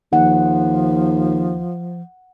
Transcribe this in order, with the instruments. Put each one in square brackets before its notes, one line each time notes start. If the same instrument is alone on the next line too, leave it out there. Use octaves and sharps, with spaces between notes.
[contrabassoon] D#2 [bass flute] F3 [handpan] F#5